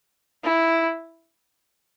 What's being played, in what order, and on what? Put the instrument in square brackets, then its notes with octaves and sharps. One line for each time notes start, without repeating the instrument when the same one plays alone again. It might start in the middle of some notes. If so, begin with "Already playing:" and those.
[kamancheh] E4